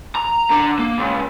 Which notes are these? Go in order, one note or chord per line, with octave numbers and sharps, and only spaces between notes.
A#5
D3
A#3
C#2